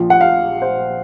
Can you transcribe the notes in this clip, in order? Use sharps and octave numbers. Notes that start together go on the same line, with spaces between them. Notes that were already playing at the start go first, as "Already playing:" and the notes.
Already playing: A#1 A#2 F3
F#5
F5
C5